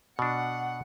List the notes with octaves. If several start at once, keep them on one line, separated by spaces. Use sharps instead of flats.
B2 D4 F#5